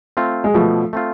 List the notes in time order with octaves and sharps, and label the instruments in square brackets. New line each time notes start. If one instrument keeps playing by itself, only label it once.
[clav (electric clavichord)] A3 C4 F4
[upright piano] G#3
[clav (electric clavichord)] B2 [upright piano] F3 A3
[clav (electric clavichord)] A3 C4 F4